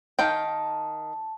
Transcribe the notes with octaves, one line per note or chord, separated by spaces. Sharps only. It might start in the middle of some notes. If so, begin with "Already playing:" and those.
D#3 F5 G5 A5